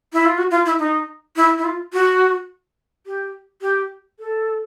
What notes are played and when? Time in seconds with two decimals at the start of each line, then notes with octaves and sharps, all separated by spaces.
0.13 E4
0.25 F4
0.38 F#4
0.51 F4
0.66 E4
0.79 D#4
1.36 E4
1.58 E4
1.64 F4
1.93 F#4
3.06 G4
3.62 G4
4.19 A4